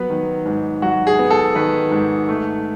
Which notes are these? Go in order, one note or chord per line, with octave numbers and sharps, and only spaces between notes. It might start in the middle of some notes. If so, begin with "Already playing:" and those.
Already playing: F#3 B3 B4
D#3
G#2
F#3 F#4
G#4
B3
A4
D#3 B4
G#2
A3